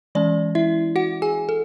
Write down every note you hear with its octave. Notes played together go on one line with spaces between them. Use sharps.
E3 G#3 C#4 D5
E4 E5
F#4 F#5
G#4 G#5
A4